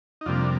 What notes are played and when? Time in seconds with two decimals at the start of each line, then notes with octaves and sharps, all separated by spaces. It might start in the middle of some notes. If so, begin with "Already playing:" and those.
0.21 D#4
0.26 F2 C3 G3 A#3 D4 F4